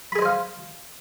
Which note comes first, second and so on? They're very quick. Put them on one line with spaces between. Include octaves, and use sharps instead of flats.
B5 G#4 D#5 C5 F5